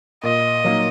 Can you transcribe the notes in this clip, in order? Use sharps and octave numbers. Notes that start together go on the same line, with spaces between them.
A#2 D#5
F#3 A#3 D#4